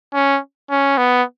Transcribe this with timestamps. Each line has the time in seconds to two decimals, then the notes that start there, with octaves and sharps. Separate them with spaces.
0.14 C#4
0.70 C#4
0.98 B3